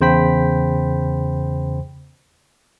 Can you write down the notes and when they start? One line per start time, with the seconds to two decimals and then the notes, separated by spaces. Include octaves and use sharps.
0.01 E2 C#3 C5 G5 B5 B6